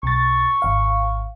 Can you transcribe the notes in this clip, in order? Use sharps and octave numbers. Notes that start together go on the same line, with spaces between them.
B1 C#6 A6
G#1 F5